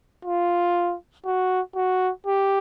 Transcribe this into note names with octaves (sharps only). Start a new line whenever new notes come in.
F4
F#4
F#4
G4